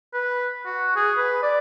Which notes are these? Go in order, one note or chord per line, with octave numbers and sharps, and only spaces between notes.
B4
F#4
G#4
B4
D5